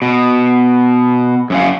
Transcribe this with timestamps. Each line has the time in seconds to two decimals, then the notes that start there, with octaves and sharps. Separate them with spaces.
0.02 B2
1.50 F#2 C#4 F5